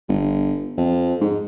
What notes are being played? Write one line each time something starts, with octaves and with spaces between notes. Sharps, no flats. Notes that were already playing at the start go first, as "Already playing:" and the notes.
G1
F2
G#2